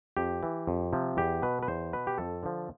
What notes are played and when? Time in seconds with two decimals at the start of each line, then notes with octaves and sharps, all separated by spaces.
0.17 F2 G4
0.43 E3
0.67 F2
0.93 C3 F3
1.17 E2 G4
1.42 B2 B4
1.63 B4
1.68 E2 C5
1.93 B2 B4
2.07 G4
2.18 F2 A4
2.43 D3 F3